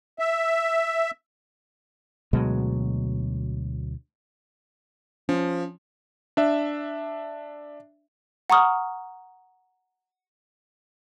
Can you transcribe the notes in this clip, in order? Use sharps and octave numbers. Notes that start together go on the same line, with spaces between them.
E5
D2 B2 F#3 G#3
F3 C#4
D4 E5
F#5 A#5 C#6 D#6 F6